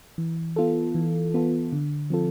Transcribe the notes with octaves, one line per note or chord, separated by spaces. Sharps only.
E3
B3 F4 A4
E3
B3 F4 A4
D3
F3 C4 F4 A4